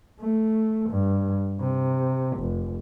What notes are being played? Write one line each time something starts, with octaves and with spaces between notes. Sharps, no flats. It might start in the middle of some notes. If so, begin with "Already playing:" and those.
A3
G2
C3
F1